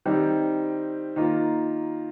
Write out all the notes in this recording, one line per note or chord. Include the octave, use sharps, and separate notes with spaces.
D#3 G3 C4
D#3 A#3 F4